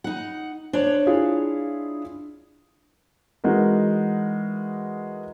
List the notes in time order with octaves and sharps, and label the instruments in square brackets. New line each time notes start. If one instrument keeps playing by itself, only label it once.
[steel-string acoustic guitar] D#4 F#5
[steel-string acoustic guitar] D4 C#5 [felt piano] C5
[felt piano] E4 F4 G#4
[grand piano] E3 G#3 D#4 F#4 A#4